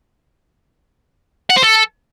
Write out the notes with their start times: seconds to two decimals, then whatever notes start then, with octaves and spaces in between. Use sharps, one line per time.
1.50 F#5
1.56 C5
1.63 A4